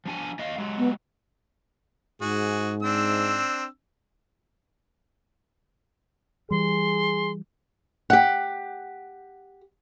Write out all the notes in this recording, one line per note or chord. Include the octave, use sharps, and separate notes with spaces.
F3 D4 G#5
A#3 D#5 F5
F#3 G#3
B3
G#2 F#4 G#4
C4 D4 E6
E3 G3 G#4 C6
G4 F#5